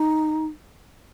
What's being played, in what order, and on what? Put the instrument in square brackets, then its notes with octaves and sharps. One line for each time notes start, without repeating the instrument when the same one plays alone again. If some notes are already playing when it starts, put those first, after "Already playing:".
Already playing: [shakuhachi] D#4